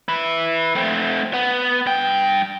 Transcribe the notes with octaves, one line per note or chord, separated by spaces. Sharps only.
E4 B4
A3 C4
B3
G2 G5